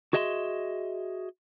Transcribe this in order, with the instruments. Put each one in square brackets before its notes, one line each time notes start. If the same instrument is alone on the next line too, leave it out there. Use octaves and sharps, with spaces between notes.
[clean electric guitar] F#4 G#4 D#5 E5 A#5 C6